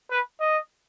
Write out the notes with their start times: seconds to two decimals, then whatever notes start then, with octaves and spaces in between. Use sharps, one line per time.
0.11 B4
0.40 D#5